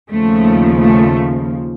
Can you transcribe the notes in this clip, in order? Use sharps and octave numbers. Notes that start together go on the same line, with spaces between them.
D#2 C#3 F3 A3
A3